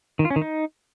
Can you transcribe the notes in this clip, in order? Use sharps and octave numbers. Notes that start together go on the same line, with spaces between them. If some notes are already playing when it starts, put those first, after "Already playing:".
D#3
F4
C#4
D#3
D#4